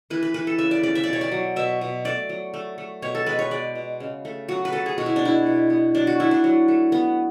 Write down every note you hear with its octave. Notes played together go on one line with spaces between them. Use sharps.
E3 B4
B4
E3 B4
A4
C#3 E5
D5
C#3 D5
E5
B2 D5
C#5
D5
F#3
B2 E5
B2
A3 D5
F#3
A3
A3
B2 C#5
A4
G#3 B4
C#5
G#3 D5
B2
C#3
A3
F#3 F#4
B4
F#3 A4
G#4
B2 F#4
E4
D4
G#3 E4
B2
B3
F#3 D4
F#4
A3 E4
D4
F#3
A3
B3